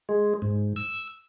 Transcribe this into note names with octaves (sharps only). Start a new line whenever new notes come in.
G#3
G#2
E6